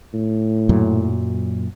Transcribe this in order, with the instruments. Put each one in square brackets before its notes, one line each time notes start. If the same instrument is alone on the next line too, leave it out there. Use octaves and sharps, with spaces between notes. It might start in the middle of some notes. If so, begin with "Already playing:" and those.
[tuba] A2
[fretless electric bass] F#2 A#2 F#3